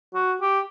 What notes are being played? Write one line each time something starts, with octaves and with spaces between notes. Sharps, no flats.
F#4
G4